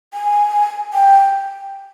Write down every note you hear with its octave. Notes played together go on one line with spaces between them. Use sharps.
G#5
G5